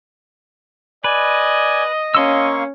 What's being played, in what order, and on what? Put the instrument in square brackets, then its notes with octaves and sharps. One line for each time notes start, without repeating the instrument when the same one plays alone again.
[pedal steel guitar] B4 [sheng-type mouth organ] D5 G#5 [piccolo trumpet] D#5
[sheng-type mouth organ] A#3 C#6 [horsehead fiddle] C#4 [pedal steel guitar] F5 C6 E6